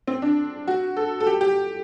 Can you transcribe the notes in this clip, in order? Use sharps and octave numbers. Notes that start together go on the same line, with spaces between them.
C4
D4
F#4
A4
A4
G4
G4